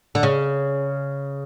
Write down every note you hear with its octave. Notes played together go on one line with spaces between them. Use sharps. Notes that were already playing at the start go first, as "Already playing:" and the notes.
D3
C#3